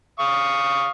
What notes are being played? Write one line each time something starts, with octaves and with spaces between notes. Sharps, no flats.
F5 C#6 D#6